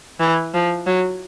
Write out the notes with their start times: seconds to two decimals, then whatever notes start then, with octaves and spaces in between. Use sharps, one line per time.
0.20 E3
0.54 F3
0.86 F#3